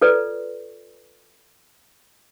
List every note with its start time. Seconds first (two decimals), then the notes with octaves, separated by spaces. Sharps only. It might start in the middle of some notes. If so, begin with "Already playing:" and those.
0.01 F4 A4 B4 D5